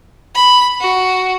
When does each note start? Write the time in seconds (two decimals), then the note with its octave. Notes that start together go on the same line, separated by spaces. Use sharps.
0.35 B5
0.81 F#4